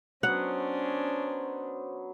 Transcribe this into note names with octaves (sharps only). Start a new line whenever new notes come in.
F#3 B3 C#4 D4 C5 F#5